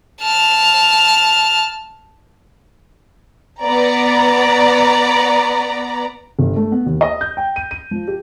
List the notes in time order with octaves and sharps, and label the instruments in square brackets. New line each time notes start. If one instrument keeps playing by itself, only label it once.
[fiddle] A5 F6
[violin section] B3 D5 A#5
[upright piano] G1
A3
B3
D#2
D#5
G6
G5
D#7
D#7
F3
G4